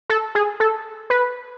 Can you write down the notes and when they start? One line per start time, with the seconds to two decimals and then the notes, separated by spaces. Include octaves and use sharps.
0.10 A4
0.35 G#4
0.60 A4
1.10 B4